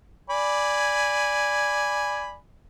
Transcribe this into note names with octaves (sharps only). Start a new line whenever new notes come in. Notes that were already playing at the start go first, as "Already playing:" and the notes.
D5 G#5 B5